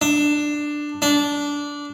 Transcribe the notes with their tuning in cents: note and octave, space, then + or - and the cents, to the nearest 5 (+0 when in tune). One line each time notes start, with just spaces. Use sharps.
D4 +10
D4 -15